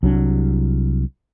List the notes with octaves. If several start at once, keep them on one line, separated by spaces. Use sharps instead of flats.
C2 F#3 D4